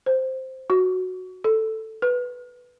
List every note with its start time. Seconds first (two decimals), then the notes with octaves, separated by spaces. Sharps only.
0.06 C5
0.70 F#4
1.44 A4
2.02 B4